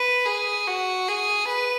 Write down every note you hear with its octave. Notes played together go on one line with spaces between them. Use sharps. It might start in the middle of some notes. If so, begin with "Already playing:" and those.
Already playing: B4
G#4
F#4
G#4
B4